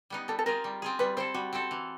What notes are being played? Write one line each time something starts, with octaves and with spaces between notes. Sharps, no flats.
G3 B3 D#4
G3 A4
A4
C4 F4 G#4 A#4
G3
C4 F4 G#4
G3 B4
C4 E4 A4 C5
G3 F#4
C4 E4 A4
E3